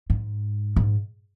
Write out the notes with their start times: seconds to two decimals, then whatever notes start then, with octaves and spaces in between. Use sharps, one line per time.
0.10 G#2
0.76 G#2